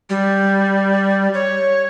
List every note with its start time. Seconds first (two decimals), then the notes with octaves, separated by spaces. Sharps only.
0.10 G3
1.34 C#5